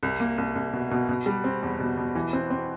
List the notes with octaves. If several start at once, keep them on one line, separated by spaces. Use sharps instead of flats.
C2
A#3
C2
C2
B2
B2
B2
G3
C4
E2
B2
B2
E3
C4
C4